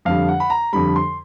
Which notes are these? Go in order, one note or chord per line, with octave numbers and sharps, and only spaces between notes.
F2 D3 G3 F5
F#5
B5
A#5
F2 D3 G3 B5
C6